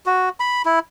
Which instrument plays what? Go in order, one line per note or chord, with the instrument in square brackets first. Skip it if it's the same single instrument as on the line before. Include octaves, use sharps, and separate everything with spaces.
[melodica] F#4
B5
E4